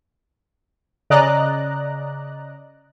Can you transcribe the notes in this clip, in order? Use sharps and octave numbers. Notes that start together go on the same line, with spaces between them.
C#3 D5 D#5 A#5 F#6